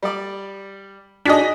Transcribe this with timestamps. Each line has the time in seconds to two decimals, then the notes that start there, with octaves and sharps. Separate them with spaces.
0.03 G3 D5
1.25 D4 D#4 F#4 G#4 D#5 B6